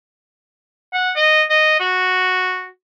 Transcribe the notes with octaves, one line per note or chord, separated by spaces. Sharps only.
F#5
D#5
D#5
F#4